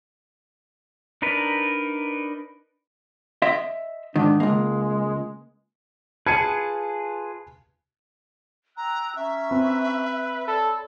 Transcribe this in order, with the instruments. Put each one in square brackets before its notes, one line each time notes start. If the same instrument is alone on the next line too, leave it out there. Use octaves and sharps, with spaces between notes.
[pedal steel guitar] D4 D#4 A#4 B4
[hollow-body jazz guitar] D#5 E5 C6
[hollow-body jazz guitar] G#2 D#3 [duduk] D4
[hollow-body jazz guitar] C#2 A#3 [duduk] G#3
[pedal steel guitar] F4 G#4 B4 [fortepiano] A5 [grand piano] G#6 C#7 D#7
[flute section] G5 E6 F#6 [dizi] A#5
[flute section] C#4 A#5 C#6 [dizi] E5
[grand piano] C4 [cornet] B4
[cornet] A4 [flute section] C#5 D5 B5